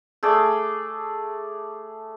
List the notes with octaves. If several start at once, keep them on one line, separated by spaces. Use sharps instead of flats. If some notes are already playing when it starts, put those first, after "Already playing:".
A3 G#4 D5